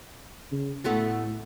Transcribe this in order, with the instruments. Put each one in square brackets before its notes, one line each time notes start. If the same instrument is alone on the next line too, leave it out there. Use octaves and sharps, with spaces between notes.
[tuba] C#3
[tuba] A2 [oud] A3 B3 F#4